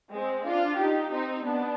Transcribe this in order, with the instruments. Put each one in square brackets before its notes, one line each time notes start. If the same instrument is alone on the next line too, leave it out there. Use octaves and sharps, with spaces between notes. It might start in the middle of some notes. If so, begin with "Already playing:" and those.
[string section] G#3 C4
D4 F4
D#4 G4
C4 D#4
B3 D4